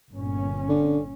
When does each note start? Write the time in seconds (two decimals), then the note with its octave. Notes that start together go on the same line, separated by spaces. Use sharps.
0.11 G1 A#2 C#4
0.69 D3